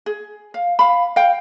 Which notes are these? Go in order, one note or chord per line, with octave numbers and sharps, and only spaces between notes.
G#4
F5
F5 B5
F5 G5